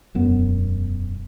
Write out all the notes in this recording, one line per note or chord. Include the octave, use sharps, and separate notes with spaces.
E1 F#2 B3